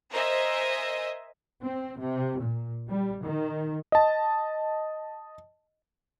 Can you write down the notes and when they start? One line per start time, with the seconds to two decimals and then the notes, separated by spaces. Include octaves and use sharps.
0.11 A#4 C5 D#5 E5 G#5
1.61 C4
2.00 C3
2.38 A#2
2.87 G3
3.23 D#3
3.92 D#5 A5